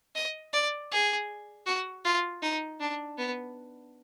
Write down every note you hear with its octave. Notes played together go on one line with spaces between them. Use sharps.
D#5
D5
G#4
F#4
F4
D#4
D4
B3